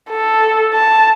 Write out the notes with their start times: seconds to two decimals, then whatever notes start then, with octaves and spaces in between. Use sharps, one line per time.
0.10 A4
0.74 A5